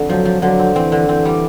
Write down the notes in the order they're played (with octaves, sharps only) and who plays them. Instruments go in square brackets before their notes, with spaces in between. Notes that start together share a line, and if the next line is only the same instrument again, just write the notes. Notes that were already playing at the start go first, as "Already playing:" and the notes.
Already playing: [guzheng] F2 D3
[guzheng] F3 [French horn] F#3
[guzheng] F3
[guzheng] D3 [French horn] F#3
[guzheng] C4
[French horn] E3 [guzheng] C4
[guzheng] D3
[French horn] E3 [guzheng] C4
[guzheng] G3